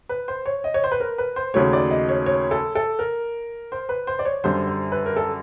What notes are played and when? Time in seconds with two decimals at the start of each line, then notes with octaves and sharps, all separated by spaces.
0.09 B4
0.28 C5
0.46 C#5
0.64 D#5
0.74 C#5
0.84 C5
0.92 B4
1.00 A#4
1.18 B4
1.36 C5
1.54 D#2 C#3 F#3 A3 C#5
1.73 D5
1.90 D#5
2.09 C#5
2.26 C#5
2.51 A4
2.75 A4
2.99 A#4
3.72 C5
3.89 B4
4.07 C5
4.19 D5
4.25 C#5
4.44 F#2 D3 G3 C5
4.67 C5
4.92 B4
5.06 A#4
5.17 A4